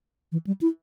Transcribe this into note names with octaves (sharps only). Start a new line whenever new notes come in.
E3
G3
E4